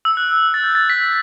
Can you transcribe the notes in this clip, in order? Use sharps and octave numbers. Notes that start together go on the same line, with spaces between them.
E6
F#6
A6
G6
A6
B6